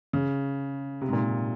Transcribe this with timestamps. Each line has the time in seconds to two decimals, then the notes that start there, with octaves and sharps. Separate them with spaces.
0.13 C#3
1.01 C3
1.08 G#2
1.13 A#2
1.24 G#2